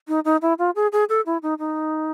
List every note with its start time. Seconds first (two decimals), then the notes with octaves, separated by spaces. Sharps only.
0.08 D#4
0.25 D#4
0.42 E4
0.59 F4
0.75 G#4
0.92 G#4
1.09 A4
1.26 E4
1.42 D#4
1.59 D#4